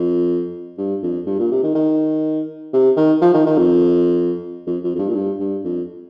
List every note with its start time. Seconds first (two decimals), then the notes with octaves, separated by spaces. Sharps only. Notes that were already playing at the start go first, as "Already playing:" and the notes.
Already playing: F2
0.78 G2
1.03 F2
1.26 G2
1.39 A#2
1.51 C3
1.63 D#3
1.75 D#3
2.73 C3
2.96 D#3
3.22 F3
3.34 D#3
3.46 D#3
3.58 F2
4.67 F2
4.84 F2
4.95 F2
4.99 G2
5.09 A#2
5.15 G2
5.40 G2
5.65 F2